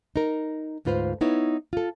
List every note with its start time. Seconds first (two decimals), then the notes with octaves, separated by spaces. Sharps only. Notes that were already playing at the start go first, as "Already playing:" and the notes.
0.16 D#4 A#4
0.85 D2 G#2 F4 B4 C5 F5
1.21 B3 D#4 E4 C#5
1.73 F4 A4